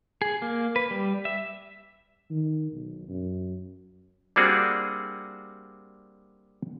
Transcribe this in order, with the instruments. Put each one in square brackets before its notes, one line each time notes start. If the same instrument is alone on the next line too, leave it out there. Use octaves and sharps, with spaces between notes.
[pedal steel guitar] G#4
A#3
B4
G3
E5
[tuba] D#3
B1
F#2
[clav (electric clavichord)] G3 A#3 C4 D4 F#4 G#4